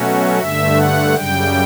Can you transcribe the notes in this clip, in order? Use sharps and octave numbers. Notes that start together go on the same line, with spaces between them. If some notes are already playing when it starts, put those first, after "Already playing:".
Already playing: B2 F#3 A3 C#4 F#4
G2 D3 A3 E5
F#5
F#2 C#3 G3 G5